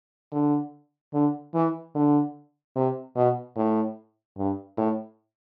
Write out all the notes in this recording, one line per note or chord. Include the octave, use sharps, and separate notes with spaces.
D3
D3
E3
D3
C3
B2
A2
G2
A2